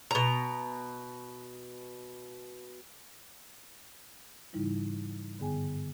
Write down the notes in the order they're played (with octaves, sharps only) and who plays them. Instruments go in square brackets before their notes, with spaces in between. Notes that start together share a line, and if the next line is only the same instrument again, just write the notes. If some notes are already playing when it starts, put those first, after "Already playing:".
[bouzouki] B2 A#5
[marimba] G#2 C#3 E3 G3 D#4 E4
G2 D3 B3 G#4 G5 G#5